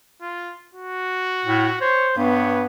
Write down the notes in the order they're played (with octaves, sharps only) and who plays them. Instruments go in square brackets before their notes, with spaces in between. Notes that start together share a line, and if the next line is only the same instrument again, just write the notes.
[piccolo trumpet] F4
F#4
[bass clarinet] A2
[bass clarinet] C5 [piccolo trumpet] C#5
[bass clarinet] G2 [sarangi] B3 [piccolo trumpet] C#5